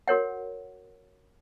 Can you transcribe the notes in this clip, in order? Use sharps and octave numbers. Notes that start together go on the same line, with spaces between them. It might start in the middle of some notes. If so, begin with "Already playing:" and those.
F#4 A#4 C#5 F#5